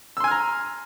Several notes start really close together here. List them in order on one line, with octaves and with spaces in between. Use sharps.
E6 C6 G#5 F6 A#5